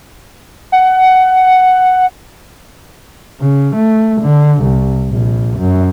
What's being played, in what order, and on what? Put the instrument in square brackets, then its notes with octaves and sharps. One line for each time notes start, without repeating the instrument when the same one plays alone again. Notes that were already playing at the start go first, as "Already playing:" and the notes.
[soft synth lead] F#5
[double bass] C#3
A3
D3
C2
A#1
F#2